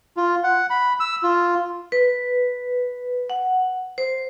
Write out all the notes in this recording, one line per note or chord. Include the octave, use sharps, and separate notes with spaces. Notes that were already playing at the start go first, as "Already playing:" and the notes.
F4
F#5
B5
E6
F4
B4
F#5
C5